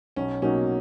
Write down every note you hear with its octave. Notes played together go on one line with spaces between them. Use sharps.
B1 C#4
B2 F#3 A#3 C#4 D#4